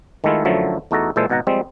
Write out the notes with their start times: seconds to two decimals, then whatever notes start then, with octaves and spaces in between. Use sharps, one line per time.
0.24 D#3 G#3 A3 E4 F4
0.45 F#2 D3 F3 F#3 A3 E4
0.91 E2 A3 D#4 F#4 A4 A#5
1.16 A#2 E3 G#3 A4 C5
1.30 G#1 B2 D#4 F#5 A#5
1.47 F3 G3 G#3 C4